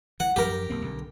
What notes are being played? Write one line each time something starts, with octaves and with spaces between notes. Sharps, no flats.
E3 F#5
F#2 F3 G4 A#4
B1 A#3 C4
B1 D3